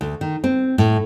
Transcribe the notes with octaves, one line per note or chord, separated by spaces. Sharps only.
D2
D#3
C4
A2